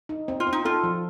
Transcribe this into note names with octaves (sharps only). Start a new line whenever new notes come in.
D#4
C4
F4
C4
D#4
F4 A4
F3